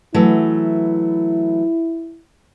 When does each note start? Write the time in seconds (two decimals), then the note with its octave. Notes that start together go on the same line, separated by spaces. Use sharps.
0.14 E3 F#3 A3 E4